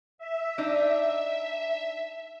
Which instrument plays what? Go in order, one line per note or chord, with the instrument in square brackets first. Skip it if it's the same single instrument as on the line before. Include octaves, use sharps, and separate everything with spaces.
[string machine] E5
[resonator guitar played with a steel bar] D4 D#4